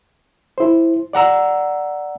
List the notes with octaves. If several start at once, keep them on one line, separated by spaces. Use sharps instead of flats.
E4 C5
D5 F#5 A#5 E6